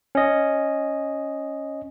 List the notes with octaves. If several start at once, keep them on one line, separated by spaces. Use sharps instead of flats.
C#4 D#5